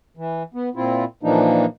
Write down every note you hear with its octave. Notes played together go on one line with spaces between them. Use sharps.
E3
B3
A#2 C4 E4 F4
A#2 E3 F3 A#3 D4 D#4